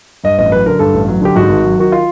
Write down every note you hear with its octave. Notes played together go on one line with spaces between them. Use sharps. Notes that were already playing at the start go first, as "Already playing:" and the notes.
G2 D#5
A1 D#5
F#3 B4
D3 A#4
G2 A4
A1
F#3
D3 G4
G#2 F#4
G#1
F#3
D#3 F#4
F4